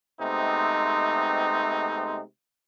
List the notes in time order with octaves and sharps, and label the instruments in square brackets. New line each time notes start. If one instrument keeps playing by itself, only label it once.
[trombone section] C3 G#3 A3 B3 C4 D#4